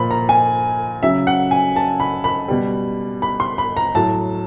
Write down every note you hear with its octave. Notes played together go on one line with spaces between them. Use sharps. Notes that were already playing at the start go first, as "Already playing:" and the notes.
Already playing: A#2 F3 B5
A#5
G#5
C#3 F#3 E5
F#5
G#5
A5
B5
B5
B2 G3
B5
C6
B5
A#5
A2 F#3 A5